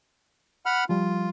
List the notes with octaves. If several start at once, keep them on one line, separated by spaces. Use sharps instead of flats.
F#5 B5 F6
F3 G3 F4